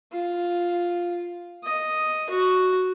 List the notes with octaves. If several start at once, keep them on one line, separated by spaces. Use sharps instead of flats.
F4
D#5
F#4